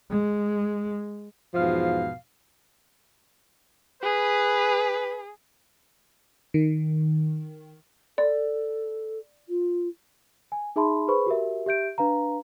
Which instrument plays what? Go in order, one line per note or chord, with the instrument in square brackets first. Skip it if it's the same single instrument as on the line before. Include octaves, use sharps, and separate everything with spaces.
[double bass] G#3
[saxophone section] E2 G#2 B2 F3 F5
[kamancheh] G#4 [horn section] B4
[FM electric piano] D#3
[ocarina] A4 [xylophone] D5
[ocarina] F4
[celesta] G#5
D#4 G#4 E5 A5 B5 C6
G#4 B4 C5 B5 C#6
F#4 G4 A#4 E5
G4 E5 G6 D7
D4 B4 F5 A#5